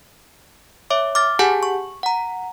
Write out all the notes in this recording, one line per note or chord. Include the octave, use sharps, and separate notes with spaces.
C#5 E5 D6
D6 F6 A6
G4 G#4 F#5 G#5 A5 G6
C#6
F#5 A#5